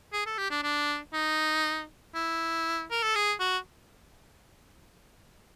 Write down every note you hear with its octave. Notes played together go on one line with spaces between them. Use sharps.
G#4
A4
G4
D4
D4
D#4
E4
A#4
A4
G#4
F#4